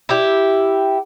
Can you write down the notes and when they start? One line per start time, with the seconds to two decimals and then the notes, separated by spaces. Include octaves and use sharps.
0.09 E4 G4